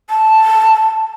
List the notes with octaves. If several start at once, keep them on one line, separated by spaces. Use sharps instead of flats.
A5